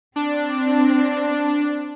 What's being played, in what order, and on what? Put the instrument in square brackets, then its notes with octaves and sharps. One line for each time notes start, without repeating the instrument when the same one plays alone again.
[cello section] C4 [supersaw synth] D4